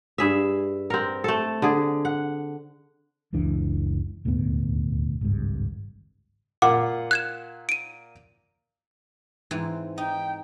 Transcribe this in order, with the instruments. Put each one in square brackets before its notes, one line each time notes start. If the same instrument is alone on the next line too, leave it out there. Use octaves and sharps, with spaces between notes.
[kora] G2 G#4 E5
C4 A#4
A3 A4
D3 G#4
F#5
[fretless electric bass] F#1 C#2 E3 D4
D#1 D2 G#2 B3
G#1 C#2 G2
[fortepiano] A#2 F4 F#5 [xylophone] D6
[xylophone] F#6 G#6 E7
D7 D#7
[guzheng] G#2 E3 C4
[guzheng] D#4 [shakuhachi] G5